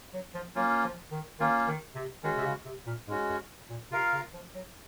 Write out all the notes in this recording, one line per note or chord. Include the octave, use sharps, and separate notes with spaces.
F#3
F3
F#3 A#3 C#4 F4
F3
D#3
D#3 A#3 C#4 F4
D#3
C3
D#3 G#3 C#4 F#4
C3
C#3
C3
A#2
G#2 G#3 C#4 F#4
F#2
A#2
C3 F4 A#4 F5
C#3
F3
F#3